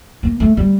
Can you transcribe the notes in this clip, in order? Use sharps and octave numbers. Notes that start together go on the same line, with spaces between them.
A#3
A3
G3